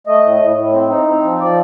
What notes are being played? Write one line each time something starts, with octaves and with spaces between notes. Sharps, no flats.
A3 D#5
A2
A2
A2
C4
D#4
C4
F3
F3 D5